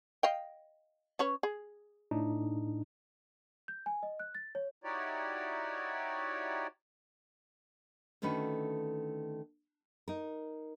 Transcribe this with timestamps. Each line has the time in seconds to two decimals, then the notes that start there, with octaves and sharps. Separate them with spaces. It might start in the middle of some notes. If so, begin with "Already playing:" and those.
0.23 D#5 F5 G5
1.19 C#4 B4 C#5
1.43 G#4
2.11 A2 D4 D#4
3.68 G6
3.86 G#5
4.03 D#5
4.20 F#6
4.35 A6
4.55 C#5
4.84 D#4 E4 F#4 G4 C#5 D5
8.22 D3 D#3 A3 C#4 F#4 B4
10.08 D#4 A#4